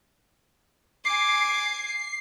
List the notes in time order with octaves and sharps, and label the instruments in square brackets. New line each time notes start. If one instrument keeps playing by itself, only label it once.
[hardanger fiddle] G#5 D6 [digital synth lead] C7